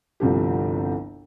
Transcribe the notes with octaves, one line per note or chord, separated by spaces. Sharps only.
G1 C2 F3 G4